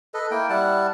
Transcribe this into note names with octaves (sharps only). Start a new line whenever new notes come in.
A4 B4 D#5
A#3 E4 G5
G3 E4 F#5 A5